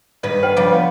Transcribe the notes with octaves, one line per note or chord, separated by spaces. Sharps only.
G2 D#3 B4 D5
C5 F#5 G5
C#3 F3 D5
B3